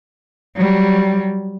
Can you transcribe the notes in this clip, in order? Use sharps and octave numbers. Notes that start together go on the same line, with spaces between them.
F#3 G3